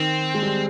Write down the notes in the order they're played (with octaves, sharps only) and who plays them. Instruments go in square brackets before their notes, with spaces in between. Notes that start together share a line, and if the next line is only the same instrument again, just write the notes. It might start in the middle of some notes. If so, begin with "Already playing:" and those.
Already playing: [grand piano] D#3 [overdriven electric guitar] C4
[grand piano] G#3
G3